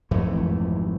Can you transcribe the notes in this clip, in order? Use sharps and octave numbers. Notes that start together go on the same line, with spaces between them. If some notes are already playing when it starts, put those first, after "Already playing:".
G#1 F2 E3 A3